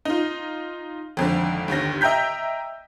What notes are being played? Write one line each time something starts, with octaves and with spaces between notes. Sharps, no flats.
D#4 F4
G#1 F2 D3
G1 D#2 D3 A#6
D#5 E5 G5 A#5 G6 B6